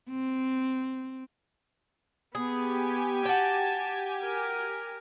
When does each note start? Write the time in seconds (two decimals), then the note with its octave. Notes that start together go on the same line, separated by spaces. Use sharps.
0.10 C4
2.35 B3 G4 G#4 G#5
3.25 F#4 G5 A5
4.24 A#4